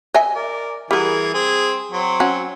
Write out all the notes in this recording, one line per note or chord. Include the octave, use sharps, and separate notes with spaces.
D#5 E5 G#5
A#4 D5
E3 G3 F#4 G#4 A#4
C4 G#4
F#3 C4
C#4 F#4